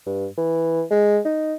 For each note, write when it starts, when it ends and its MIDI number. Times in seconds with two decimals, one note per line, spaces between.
0.06 0.27 43
0.37 0.83 52
0.90 1.19 56
1.25 1.55 63